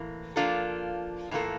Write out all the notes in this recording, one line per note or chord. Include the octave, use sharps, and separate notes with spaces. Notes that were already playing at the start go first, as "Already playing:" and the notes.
Already playing: A2 E3 A#3
F3 A#3 D4 F4 A4
A2 E3 A#3 F4 A4